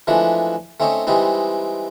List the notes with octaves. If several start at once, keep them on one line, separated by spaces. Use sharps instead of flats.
E3 F3 G#3 A3 D4
A3 C4 C#4 D#4
E3 G3 G#3 C4 D#4